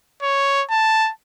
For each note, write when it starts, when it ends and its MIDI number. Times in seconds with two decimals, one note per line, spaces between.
0.22 0.63 73
0.71 1.11 81